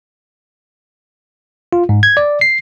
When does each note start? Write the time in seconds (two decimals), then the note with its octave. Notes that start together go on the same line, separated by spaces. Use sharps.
1.73 F4
1.89 G#2
2.03 G#6
2.17 D5
2.41 C7